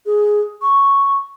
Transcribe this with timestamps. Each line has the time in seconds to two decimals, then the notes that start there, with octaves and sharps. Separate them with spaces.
0.06 G#4
0.62 C#6